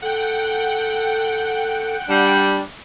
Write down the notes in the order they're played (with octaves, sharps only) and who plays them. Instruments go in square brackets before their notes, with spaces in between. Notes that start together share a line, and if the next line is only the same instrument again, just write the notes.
[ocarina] A4 [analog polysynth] F#5 G5
[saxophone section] G3 D4